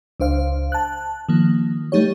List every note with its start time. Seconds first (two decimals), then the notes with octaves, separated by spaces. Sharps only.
0.20 C#2 D4 C5 F5
0.72 A5 F#6
1.29 D#3 F3 A#3
1.92 G3 A3 D#4 G4 C#5